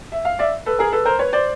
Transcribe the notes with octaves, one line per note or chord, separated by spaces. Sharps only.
E5
F5
D5 E5
A4 B4
G#4 A#4
A4 B4
A#4 C5
B4 C#5
C5 D5